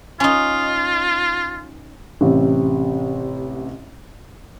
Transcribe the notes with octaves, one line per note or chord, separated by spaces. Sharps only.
C#4 D#4 F4
A1 C3